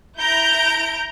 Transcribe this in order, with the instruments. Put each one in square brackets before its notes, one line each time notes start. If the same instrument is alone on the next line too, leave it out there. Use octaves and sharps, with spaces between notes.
[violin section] E4 A#5 G6 D7